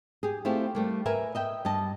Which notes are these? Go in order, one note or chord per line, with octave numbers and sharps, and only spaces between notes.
G4 G#4
A3 C4 E4 F4 G4
G3 A3 A#3
A#4 B4 E5 G#5
D#5 E5 G5
G2 D#5 A5